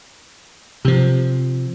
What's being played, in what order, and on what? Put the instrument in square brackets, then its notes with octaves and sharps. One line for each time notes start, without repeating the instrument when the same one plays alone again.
[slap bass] C3 F3